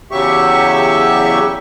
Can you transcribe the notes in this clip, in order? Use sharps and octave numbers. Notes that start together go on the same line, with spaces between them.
E2 C#3 F#3 G4 E5 C#6